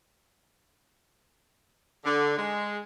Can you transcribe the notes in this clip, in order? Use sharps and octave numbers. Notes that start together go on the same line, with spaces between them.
D3
G#3